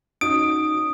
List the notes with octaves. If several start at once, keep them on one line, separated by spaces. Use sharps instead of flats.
C#4 D#4 F#4 D#6 D7